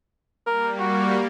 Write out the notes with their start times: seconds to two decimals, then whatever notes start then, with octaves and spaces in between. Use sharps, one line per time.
0.46 G3 A#3 A#4
0.80 F#4